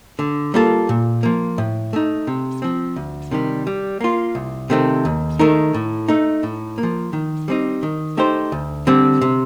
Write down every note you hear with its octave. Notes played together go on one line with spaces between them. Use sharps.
D3
G3 A#3 F4 A4
A#2
F3 A#3
A2
A3 D#4
C3
F3 C4
D2
C3 D#3 G3
G3
A#3 F4
C2
C3 D#3 A3 C4
D#2
D#3 A3 D#4 A#4
A2
A3 D#4
A2
A#3
F3
D#3
G3 C4 D#4
D#3
A3 D#4 G4 C5
D2
D3 G3 C4
C3